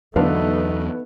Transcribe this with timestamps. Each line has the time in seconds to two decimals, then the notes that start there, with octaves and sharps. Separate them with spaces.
0.16 E2 D3 F#3 A3 B3 D4 D#4 F5